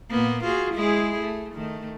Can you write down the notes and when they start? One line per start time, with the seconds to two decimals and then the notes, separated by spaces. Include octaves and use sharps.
0.11 A#2 A#3 B3
0.43 F4 F#4 G#4
0.74 G#3 E4 G#4
1.19 A3
1.55 D#3 A3